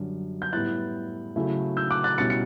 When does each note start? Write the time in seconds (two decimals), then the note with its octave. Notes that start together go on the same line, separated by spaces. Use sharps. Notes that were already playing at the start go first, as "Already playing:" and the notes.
Already playing: F#2 D3 G3 D4
0.42 G6
0.53 A2 G3 B3 E4 F#6 A6
1.36 C#3 F#3 A3 E4
1.77 E6 G6
1.90 D6 F#6
2.04 F#6 A6
2.18 B2 G3 C#4 E4 A6 C#7
2.30 C#7